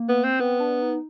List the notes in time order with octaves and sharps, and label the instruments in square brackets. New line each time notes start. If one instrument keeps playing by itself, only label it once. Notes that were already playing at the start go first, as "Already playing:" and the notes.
Already playing: [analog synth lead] A#3
[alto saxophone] B3
C4
[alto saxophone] B3 [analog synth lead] C4
[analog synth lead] D4
D#4